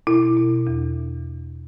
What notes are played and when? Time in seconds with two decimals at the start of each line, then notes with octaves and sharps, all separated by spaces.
0.07 B2 E4
0.37 B2
0.67 E2